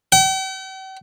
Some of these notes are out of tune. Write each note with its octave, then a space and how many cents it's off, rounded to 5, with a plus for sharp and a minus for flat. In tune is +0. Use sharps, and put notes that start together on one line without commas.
G5 -45